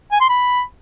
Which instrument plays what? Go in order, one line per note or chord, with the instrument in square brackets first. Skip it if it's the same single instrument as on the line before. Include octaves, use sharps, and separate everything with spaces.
[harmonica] G#5
C6
B5